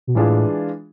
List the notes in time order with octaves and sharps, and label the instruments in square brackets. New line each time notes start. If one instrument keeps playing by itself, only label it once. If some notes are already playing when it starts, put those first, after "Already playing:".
[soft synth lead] B2
[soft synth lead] A2 [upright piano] E3 G#3 D4 F4 G#4